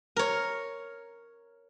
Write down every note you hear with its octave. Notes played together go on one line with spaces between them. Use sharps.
A#4 C#5